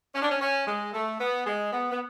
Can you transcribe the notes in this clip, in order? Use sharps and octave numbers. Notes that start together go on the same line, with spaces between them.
C#4
D4
C#4
C#4
G#3
A3
B3
G#3
B3
B3